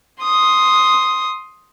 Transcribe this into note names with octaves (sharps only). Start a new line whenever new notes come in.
C6 D#6